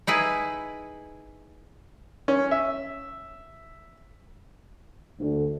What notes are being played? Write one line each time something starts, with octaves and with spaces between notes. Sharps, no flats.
D#4 E4 G#4 B4
C#4
E5
D2